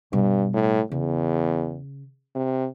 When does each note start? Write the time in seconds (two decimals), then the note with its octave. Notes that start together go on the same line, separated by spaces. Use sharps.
0.13 G2 B2 G3
0.53 A2
0.92 E2 C#3
2.35 C3